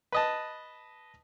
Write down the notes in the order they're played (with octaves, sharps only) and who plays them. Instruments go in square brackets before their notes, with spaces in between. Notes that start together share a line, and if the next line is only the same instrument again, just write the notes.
[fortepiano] B4 D#5 A5